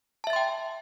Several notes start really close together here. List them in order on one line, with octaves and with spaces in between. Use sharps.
A5 E5 A6 C6 G5